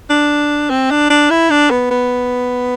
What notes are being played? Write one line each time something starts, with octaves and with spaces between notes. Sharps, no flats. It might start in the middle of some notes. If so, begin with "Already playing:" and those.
D4
C4
D4
D4
E4
D4
B3
B3